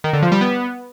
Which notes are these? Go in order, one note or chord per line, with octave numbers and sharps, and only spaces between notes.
D#3
D3
F3
G3
B3